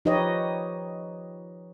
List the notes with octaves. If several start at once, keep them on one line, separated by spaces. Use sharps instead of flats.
F3 D#4 G4 B4 C#5 D#5